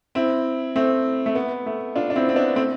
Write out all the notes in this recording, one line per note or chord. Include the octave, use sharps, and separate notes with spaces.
C4 E4
A3 C4
A3
B3
A3
D4 F4
D4
C4 E4
C4
B3 D4
A3 C4